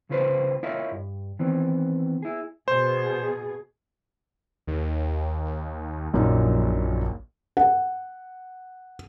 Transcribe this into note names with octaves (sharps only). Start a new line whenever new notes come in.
C2 C#3 F4 B4 C5
E4 F4 A#4 C#5 D#5 F5
G2
D#3 E3 B3 C4
E4 G#4
B2 G#4 C5
D#2
A#1 F#2 A#2 D#4
F#5